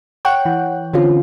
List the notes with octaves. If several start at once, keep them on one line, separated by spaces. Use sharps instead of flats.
C#5 F#5 G5 F#6
E3
D3 C4 C#4 F4